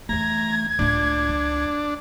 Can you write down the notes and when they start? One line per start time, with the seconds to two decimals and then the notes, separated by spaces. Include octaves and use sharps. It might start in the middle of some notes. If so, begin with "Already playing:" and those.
0.09 E2 E3 A3 A#5 G#6
0.79 C#2 A2 D4 F4
1.29 F3